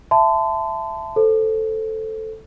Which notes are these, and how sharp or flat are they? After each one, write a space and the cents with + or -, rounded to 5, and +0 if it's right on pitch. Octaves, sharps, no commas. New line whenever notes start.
E5 +15 A5 +0 C6 -35
A4 +0 C5 +0